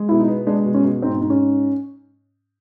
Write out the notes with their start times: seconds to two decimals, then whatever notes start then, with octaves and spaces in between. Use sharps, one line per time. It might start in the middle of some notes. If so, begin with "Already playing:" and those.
Already playing: G#3
0.09 B2 E4
0.19 D#4
0.28 B3
0.47 G#3 D4
0.65 B2
0.74 C#4
0.84 B2
1.02 G#2 C4
1.21 G#2
1.30 C#4